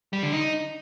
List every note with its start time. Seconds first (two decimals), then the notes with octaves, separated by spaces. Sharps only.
0.13 G3
0.23 D3
0.33 D#4